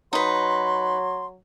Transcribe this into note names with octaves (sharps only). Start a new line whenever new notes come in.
F#3 D#4 B4 C6